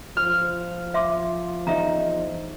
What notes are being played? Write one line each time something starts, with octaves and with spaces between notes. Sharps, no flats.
F3 F6
E5 C6 D6
E2 D#4 E5 A#5